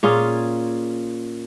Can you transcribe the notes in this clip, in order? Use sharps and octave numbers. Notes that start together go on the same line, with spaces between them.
A#2 C#4 F4 G#4